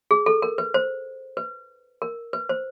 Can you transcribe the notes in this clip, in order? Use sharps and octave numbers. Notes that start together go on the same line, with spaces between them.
G#4
A4
A#4
B4
C5
B4
A#4
B4
C5